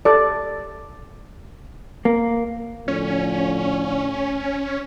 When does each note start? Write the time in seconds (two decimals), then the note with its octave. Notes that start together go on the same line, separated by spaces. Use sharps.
0.05 A4 D5
2.05 A#3
2.88 A2 D3 F3 C#4